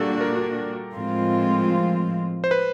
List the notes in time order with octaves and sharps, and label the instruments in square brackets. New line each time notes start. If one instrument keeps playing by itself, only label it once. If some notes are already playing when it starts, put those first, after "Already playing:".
Already playing: [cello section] A#2 G3 A#3 D4 F#4 [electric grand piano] G4 A4
[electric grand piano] A#4
[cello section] A2 F3 G#3 C4 F4
[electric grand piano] C5
B4